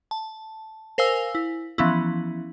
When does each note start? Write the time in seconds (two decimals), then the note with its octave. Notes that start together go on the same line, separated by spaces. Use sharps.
0.11 A5
0.98 A#4 C5 F5 G#5 E6
1.35 E4
1.78 E3 F3 B3 C#4 E4